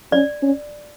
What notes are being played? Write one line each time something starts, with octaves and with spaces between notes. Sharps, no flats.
C#4 D5
C#4